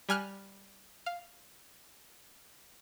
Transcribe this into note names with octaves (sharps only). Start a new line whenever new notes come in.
G3 G#5 F6 F#6
F5